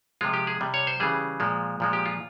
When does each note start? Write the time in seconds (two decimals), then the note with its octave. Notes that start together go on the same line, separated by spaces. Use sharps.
0.21 C3 F3 G#3 F4
0.34 G4
0.47 G#4
0.61 C3 G3
0.74 C#5
0.87 C5
1.00 C#3 E3 G3 G#4
1.40 A#2 F3 G#3
1.80 A#2 F3 G#3
1.93 G4
2.06 F4